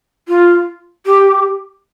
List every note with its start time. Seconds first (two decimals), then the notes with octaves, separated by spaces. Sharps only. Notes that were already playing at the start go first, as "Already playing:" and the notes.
0.28 F4
1.06 G4